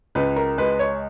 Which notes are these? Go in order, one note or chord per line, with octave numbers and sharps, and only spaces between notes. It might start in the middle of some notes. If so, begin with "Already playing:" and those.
C#2 B4
A#4
G#3 B4
C#5